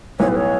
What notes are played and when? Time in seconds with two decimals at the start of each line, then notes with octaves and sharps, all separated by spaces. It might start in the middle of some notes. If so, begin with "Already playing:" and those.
0.19 B1 A2 G3 B3 C#5
0.28 B4
0.36 C#5